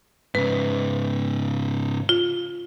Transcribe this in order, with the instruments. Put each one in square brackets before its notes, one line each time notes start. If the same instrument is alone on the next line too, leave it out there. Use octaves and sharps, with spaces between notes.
[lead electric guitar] G#2 C#3 [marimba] B4
[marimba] F4